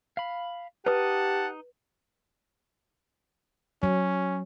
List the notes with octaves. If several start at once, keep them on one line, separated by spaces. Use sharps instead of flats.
F5 B5
D#4 G4 B4 F#5 A5 D#6
F#3 C#4